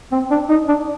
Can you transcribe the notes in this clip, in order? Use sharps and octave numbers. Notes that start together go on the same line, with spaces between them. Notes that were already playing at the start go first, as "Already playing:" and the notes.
C4
D4
D#4
D4